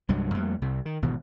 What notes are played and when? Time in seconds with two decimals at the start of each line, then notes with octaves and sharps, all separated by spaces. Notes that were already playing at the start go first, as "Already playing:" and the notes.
0.09 C2 G2 F#3 G#3
0.34 F2 G3 A3 A#3
0.62 C2 C3
0.86 D#3
1.02 G#1 B2 E3